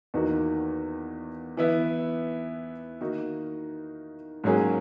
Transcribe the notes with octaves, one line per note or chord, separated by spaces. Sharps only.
E2 D#3 A#3 D#4 F#4
E3 B3 E4
D#3 A#3 D#4 F#4
G#2 F#3 A#3 C#4 G#4